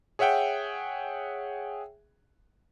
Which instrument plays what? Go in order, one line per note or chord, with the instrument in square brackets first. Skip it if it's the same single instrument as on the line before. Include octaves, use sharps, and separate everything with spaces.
[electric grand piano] G#4 C#5 E5 F#5 G5